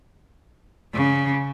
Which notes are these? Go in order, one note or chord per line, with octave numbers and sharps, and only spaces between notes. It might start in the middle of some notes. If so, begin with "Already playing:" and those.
C#3